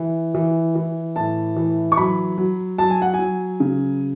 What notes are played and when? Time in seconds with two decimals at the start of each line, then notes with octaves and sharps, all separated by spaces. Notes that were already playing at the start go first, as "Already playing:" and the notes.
Already playing: E3
0.35 E3
0.75 E3
1.16 A2 A5
1.56 E3
1.92 C#6
1.97 F#3 B5
2.38 F#3
2.78 F#3 A5
2.90 G#5
3.02 F#5
3.14 G#5
3.19 F#3
3.60 C#3